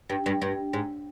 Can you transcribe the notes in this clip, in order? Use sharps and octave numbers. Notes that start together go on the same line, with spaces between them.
G2
G2
G2
G#2